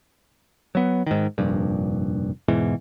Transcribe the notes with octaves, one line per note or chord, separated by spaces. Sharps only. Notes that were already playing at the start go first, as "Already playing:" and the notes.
F#3 B3
G#2 D#3
F1 A#1 G2
E2 G#2 B2 E3